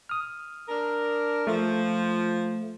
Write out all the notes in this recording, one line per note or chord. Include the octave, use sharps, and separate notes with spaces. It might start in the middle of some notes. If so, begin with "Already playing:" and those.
D#6 F6
D4 A#4
F3 A3